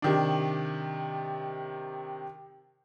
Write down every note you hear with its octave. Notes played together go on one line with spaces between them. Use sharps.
C3 D#3 D4